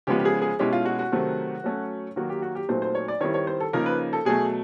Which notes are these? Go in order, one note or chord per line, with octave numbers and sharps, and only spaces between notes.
C#3 F3 G#3 B3 G4
G4
G#4
G#4
B2 G#3 C#4 E4 G4
F4
F#4
F#4
C3 D#3 F#3 A3 C4
F#3 A3 C#4
D#3 F#3 A#3 F#4
G4
F#4
G4
A#2 F#3 A3 C4 D#4 C5
C5
C#5
D5
D#3 G3 C4 E4 C#5
C#5
C5
A4
C#3 F3 A#3 D#4 A#4
B4
A4
B2 F#3 A3 G#4